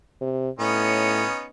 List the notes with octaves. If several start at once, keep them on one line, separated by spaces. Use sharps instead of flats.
C3
A2 B3 C#4 D#4